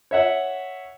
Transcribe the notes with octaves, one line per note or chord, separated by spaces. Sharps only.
C#5 E5 F#5